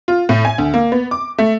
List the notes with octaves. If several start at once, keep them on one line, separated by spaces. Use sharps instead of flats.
F4
A2
G#5
D2
A#3
B3
D6
A3